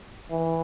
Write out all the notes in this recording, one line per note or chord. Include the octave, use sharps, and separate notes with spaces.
E3